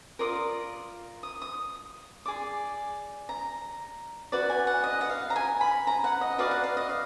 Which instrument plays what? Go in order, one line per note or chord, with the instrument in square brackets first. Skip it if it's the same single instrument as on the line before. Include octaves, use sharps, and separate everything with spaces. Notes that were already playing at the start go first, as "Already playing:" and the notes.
[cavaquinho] F4 A#4 D5 D#6
D#6
D#6
G#4 D5 D6
A#5
F#4 B4 D5
G#5
F#5
D#5
F#5
F5
A#5
G#5
B5
A#5
F#5
D#5
F#4 B4 D5 F5
F#5
F5
D#5
F5